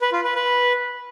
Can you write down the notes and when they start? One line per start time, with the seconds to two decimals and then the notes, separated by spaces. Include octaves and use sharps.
0.01 B4
0.12 F4
0.24 B4
0.35 B4